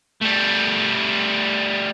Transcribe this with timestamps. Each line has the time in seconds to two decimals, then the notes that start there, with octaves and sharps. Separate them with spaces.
0.22 G3 A3